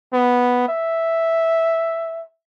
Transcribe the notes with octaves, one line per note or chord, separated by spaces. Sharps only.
B3
E5